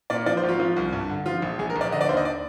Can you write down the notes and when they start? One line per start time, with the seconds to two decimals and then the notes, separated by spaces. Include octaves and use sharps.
0.10 A#2 D5
0.26 F3 D5
0.37 C5
0.43 G#1
0.49 F4
0.60 F3
0.76 C2
0.93 G2
1.10 D3
1.26 F3 F4
1.42 A#1
1.59 A#1 G#4
1.70 A#4
1.76 A#1
1.81 D5
1.92 D3 D#5
2.01 D5
2.09 D#2 C5
2.17 D#5
2.25 D5